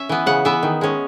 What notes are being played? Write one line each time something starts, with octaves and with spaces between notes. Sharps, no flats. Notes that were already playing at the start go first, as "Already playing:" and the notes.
Already playing: C#4 E5
E3 B3
C#3 F#5
E3 B3 E5
D#3
G#3 C#4